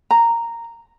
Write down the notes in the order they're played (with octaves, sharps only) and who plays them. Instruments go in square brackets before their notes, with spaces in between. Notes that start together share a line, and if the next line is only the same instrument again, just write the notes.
[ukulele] A#5